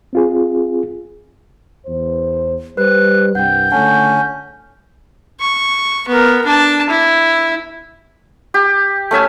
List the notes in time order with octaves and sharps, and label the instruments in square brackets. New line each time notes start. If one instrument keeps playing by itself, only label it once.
[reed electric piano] C4 F4 G#4
[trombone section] E2 C5
[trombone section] G3 [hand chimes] B4 C5 [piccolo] F#6
[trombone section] C2 G2 [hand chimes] F#5 G5 [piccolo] G6
[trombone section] C#2 D3 A3 [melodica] C#4 [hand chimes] F#5 A5
[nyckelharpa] C#6
B3 A#4
D4 A5
E4
[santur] G4
A3 C#4 E5 G#5